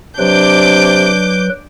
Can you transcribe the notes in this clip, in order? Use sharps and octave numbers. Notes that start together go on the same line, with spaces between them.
C3 F#3 D4 B4 D6 G6